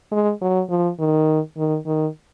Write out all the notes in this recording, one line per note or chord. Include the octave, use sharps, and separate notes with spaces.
G#3
F#3
F3
D#3
D#3
D#3